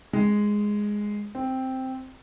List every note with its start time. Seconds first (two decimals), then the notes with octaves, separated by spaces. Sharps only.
0.13 G#3
1.35 C4